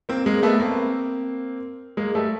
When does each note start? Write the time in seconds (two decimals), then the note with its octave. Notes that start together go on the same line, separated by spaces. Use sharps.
0.09 A#3 C4
0.26 G#3 A#3
0.43 A3 B3
0.60 A#3 C4
1.97 G#3 A#3
2.15 G3 A3